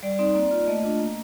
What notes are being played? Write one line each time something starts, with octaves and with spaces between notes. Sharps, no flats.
G3 D5
C4 D#4 D5
A#3 D5
F4
A3 D#5
D4 F4
A#3